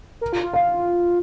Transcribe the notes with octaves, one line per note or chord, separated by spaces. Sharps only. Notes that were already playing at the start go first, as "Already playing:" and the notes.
A#4
F4
F4
F5